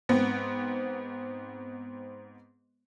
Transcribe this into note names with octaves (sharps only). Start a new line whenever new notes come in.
G#2 B3 C4